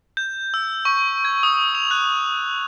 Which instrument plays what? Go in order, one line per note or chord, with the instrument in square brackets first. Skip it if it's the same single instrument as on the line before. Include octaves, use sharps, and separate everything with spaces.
[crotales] G6
E6
C#6
G#6
D#6
F7
F#6